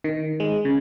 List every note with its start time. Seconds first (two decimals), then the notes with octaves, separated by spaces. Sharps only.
0.04 D#3
0.40 G#3
0.65 C#3